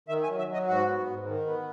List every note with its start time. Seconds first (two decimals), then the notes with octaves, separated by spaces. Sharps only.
0.08 D#3 E5
0.23 G#5
0.28 F#3
0.38 E5
0.49 F#3 D#5
0.67 G#2 F#4
0.87 B3
1.07 G#2
1.27 D#3
1.47 B3